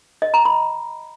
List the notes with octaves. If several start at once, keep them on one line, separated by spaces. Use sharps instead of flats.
D#5
A#5
B5